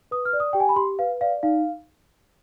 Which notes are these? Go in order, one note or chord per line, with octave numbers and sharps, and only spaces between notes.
B4 D#6
F6
D5
D#6
G4 G5
G#5
B5
G4 C6
B4 F5
D5 F5
D#4 F5